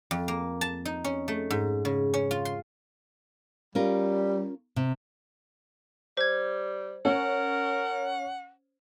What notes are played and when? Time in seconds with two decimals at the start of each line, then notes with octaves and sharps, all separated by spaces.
0.11 F2
0.28 A#3
0.61 A5
0.85 D#4
1.04 C#4
1.28 A3
1.51 G#2
1.85 C#3
2.14 C#4
2.31 F4
2.45 C6
3.75 G3 C#4 F4 A#4
4.76 C3
6.17 G3 C5 G#6
7.05 C#4 A#4 F#5